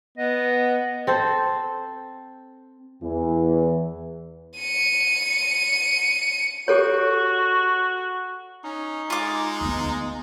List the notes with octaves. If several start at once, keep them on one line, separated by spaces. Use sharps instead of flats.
B3 D#5
C4 A4 C5
E2 E3
C#7 D#7
F#4 G4 A4 C#5
C#4 D#4
G#3 F4 D6
D2 B3